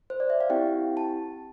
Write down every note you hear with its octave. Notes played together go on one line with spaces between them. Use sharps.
C5
D5
E5
F5
C4 E4 G4 G5
A5